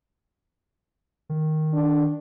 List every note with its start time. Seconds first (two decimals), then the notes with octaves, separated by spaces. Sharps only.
1.29 D#3
1.73 D4